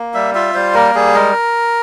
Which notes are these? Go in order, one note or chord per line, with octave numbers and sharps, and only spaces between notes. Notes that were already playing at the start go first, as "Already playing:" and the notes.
Already playing: A#3
G3 E5
F4 E5
G3 C5
A#3 A#4
G3 G#4
G#3 A#4